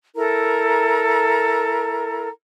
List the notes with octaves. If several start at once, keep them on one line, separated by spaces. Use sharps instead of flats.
E4 A4 A#4 A#5